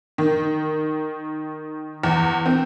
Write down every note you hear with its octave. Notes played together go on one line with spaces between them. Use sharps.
D#3
E2
C4